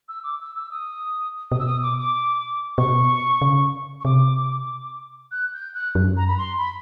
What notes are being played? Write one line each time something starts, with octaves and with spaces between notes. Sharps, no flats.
E6
D6
E6
E6
D#6
B2 D#6
E6
D#6
D6
D6
B2 C#6
C#3
C#6
C3 D6
F#6
G6
F#6
F#2
A#5
B5
C6
B5